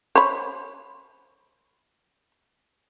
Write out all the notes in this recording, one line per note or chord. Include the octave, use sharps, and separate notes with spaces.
C5 C#5 B5